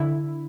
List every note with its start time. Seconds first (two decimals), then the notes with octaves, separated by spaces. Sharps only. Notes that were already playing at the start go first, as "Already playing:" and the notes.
Already playing: D3 E4